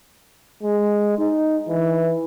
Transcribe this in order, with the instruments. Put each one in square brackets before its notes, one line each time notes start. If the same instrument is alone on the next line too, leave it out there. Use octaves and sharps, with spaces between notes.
[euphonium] G#3
D#4
E3